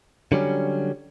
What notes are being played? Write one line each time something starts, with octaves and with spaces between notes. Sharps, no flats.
D3 F#3 G3 C#4